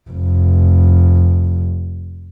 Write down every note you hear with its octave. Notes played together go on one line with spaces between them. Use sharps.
F1 F2